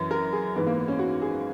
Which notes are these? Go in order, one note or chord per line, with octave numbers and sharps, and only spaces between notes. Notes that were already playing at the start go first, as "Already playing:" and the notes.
Already playing: F#2 E3
A#4
G#4
G#2 E3 B3
A#3
B3
C#4
F#4
G#4